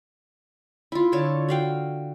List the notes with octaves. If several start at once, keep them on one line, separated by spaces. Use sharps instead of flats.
E4 F4
D3 A4 C#5 A5
F#4 F5 G5